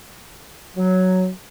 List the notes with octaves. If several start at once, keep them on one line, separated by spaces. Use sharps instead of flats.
F#3